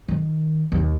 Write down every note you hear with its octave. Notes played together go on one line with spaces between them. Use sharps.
D#3
D#2